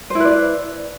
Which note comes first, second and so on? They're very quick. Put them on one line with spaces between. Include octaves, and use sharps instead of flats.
C5 E4 B4 D5